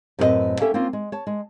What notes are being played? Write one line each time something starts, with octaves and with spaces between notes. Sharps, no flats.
F#2 A2 C4 F#4 B4 D#5
A#3 C#4 A4 E5 G5
A#3 C4 C#4 F4
G#3
C#5 A5
G#3